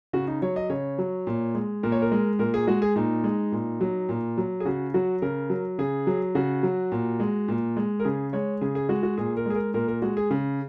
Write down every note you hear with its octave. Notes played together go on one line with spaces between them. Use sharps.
C#3 F#4
D#4
F#3 C#5
D#5
C#3 C#5
F#3
A#2
G#3
A#2 A#4
C#5
A#4
G#3
A#2 A#4
G#4
G#3 F#4
G#4
A#2 D#4
G#3
A#2
F#3
A#2
F#3
G#4
C#3 F#4
F#3 F#4
C#3 A#4
F#3
C#3 G#4
F#3
C#3 F#4
F#3
A#2
G#3
A#2
G#3
A#4
C#3 G#4
G#3 C#5
C#3 G#4
G#4
G#3 F#4
F#4
A#2 G#4
A#4
G#3 G#4
A#4
A#2 A#4
A#4
G#3 F#4
G#4
C#3